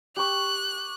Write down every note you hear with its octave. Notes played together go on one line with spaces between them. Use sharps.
G4 C#6 F#6